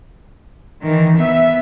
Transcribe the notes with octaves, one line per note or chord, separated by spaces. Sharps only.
D#3 E3
B3 E5